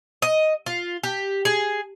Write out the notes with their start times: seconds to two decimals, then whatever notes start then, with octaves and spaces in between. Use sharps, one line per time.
0.22 D#5
0.66 F4
1.04 G4
1.45 G#4